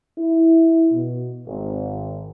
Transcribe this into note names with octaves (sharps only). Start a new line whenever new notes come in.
E4
B2
G#1